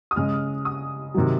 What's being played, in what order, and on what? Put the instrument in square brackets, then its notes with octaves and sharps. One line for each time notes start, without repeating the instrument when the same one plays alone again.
[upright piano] D#6
C#3 G#3 F6
D#6
C3 D#3 F#3